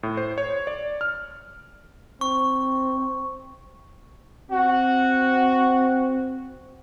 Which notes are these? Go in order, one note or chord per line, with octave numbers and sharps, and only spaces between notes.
A2
C5
C#5
D5
F6
C4 C#6
C4 F#4